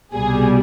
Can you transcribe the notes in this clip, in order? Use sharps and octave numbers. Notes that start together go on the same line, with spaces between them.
C2 B2 G3 G#4